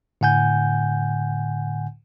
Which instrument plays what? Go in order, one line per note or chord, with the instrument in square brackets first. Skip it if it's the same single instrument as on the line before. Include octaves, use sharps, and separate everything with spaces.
[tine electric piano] A2 D3 F#5 G#5 G6